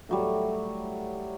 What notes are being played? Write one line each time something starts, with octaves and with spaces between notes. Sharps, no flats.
A2 F#3 G3